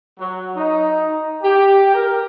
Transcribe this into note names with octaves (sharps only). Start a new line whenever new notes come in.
F#3
D#4
G4
A#4